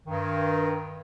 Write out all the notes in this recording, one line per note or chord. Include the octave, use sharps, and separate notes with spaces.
G2 D#3